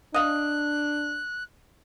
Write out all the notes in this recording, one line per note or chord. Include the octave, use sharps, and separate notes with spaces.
D4 D#5 F5 F#6